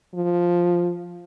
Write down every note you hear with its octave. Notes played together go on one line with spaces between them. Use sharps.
F3